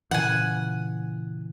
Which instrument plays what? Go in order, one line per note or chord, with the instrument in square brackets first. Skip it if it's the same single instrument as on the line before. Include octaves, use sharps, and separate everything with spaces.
[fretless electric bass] A#2 C#3 E3 [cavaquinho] F#5 G#5